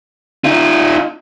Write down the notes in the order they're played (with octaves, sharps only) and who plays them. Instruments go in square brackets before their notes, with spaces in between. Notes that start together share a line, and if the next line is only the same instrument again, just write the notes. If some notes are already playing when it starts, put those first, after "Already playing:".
[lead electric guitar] D#4 F4